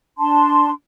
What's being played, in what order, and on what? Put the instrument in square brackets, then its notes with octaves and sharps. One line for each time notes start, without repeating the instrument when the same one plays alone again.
[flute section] D4 A5 C6